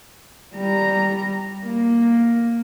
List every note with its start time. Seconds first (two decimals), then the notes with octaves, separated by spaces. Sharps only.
0.54 G3 A#5
1.65 A#3